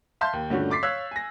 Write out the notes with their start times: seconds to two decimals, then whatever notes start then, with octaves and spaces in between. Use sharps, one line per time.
0.21 E5 F5 A5 C6 G6
0.33 D#2
0.50 G2 A#2 D3 A3 C#4 F#4
0.71 C6 D6 A6 B6 C7
0.83 C#5 F5 E6 F#6 G#6 B6
1.11 G#5 A#6